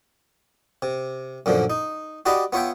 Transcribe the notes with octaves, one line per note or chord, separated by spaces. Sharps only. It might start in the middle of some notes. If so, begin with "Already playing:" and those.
C3
F#2 A#2 D3 F3
D#4
F#4 G4 D5 D#5 B5
B3 F4 C#5 E5 G5